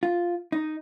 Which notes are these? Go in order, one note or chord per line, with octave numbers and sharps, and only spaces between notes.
F4
D#4